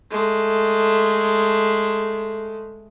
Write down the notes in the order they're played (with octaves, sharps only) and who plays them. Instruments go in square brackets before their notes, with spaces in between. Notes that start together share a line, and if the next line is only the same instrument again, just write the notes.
[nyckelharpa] G#3 A3